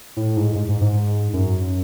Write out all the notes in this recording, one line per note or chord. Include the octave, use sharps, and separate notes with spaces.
A2
G#2
G#2
G#2
G#2
F#2